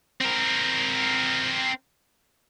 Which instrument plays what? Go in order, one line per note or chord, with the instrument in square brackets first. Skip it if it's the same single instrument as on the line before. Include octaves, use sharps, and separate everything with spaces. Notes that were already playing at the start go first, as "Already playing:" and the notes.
[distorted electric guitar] C4 A#4